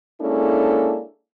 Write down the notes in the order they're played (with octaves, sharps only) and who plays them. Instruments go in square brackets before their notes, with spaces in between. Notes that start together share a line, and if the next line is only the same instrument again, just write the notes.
[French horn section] G#3 A#3 C#4 D4 E4 A4